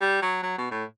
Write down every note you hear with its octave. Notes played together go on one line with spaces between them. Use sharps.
G3
F#3
F#3
B2
A2